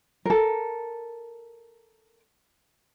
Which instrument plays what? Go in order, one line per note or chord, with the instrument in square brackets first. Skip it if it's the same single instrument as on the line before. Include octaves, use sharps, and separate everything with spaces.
[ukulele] A4 A#4